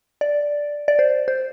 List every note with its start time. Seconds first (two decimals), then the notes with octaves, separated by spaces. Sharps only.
0.21 D5
0.88 D5
0.99 C5
1.28 C5